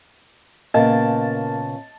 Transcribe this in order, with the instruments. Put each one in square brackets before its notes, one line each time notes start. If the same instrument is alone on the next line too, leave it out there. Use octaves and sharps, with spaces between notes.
[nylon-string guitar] A#2 C#3 B3 [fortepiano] A#3 [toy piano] D#5 [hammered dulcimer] A5